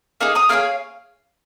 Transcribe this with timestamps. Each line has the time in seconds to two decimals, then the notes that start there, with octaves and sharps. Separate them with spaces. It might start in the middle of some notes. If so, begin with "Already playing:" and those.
0.21 A#3 D#4 G#4
0.35 A#5 D#6
0.49 A#3 D#4 G#4 C#5 F5